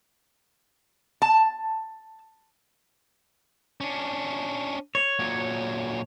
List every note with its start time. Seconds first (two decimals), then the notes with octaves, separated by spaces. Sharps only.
1.22 A5
3.81 C#4 D4
4.95 C#5
5.19 A#2 F#3